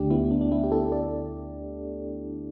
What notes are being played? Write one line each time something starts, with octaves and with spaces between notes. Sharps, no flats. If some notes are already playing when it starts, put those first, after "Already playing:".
Already playing: D2 D3 A3 D4 G4
B3 E4
D4
D4
B3 E4
G4
E4 A4
A4 D5